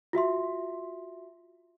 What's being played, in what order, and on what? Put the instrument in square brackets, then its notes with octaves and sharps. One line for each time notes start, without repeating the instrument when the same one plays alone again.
[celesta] F4 F#4 E5 C6